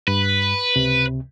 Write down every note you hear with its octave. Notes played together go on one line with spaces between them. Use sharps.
G2 B4
C#2 C3